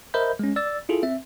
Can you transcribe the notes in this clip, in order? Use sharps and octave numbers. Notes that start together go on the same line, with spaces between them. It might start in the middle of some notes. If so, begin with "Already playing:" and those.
A#4 C5 D#5 E5 B5 G6
G#3 C#4
D5 E6 A6
E4 F4 G#4 A4
C4 E5